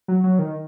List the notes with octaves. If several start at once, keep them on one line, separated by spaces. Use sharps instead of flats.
F#3
F#3
D#3